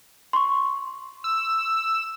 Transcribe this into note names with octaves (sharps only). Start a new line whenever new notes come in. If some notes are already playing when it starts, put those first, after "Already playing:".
C6 C#6
E6